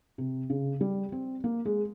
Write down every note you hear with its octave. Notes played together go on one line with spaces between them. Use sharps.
C3
C#3
G3
C4
A#3
G#3